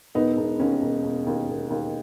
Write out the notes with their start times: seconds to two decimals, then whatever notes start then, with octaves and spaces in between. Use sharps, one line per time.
0.15 E1 B3 D#4
0.37 E1
0.59 D#2 C#4
0.82 E1
1.04 E1
1.26 D#2
1.48 E1
1.70 D#2